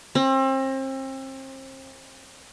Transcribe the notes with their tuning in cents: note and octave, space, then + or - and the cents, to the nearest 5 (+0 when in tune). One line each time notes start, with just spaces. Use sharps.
C4 +35